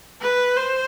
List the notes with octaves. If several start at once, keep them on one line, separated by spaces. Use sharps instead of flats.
B4
C5